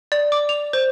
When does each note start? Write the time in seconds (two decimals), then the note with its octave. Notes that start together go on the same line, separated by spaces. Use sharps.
0.12 D5
0.32 D6
0.49 F7
0.73 C5